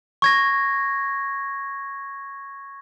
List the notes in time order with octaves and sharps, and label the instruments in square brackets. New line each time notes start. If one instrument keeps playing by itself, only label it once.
[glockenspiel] C#6 G#6 A#6